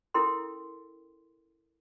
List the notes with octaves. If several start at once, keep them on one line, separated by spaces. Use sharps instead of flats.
C#4 E4 A4 A#4 G5 C6